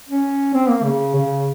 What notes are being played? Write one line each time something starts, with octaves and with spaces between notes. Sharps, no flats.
C#4
C4
A#3
C#3
C#3